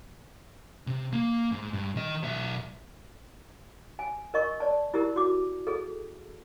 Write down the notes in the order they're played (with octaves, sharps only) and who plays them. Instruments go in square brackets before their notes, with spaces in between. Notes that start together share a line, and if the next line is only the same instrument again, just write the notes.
[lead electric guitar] C3
A#3
G#2
G2
D#3 D#5
B1 E5
[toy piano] G#5
A#4 D#5 C#6
D5 A5
E4 G4 A#4
F#4 D6
G#4 A4